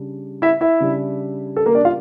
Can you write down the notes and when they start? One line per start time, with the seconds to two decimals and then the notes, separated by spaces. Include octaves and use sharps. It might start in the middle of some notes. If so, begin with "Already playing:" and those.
Already playing: C#3 G3 D4
0.42 E4 E5
0.61 E4 E5
0.80 C#3 G3 D4
1.57 A4
1.66 A#3 A#4
1.75 D4 D5
1.85 F4 F5